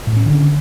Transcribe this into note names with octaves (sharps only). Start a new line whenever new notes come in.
A2
C#4
D3